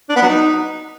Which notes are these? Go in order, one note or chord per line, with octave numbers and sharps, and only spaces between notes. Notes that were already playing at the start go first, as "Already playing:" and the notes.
D4
B3
F#3
D#4